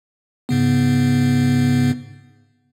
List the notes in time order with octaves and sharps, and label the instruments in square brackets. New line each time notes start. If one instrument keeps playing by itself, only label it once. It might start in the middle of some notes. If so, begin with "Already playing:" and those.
[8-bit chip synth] G#2 C#3 B3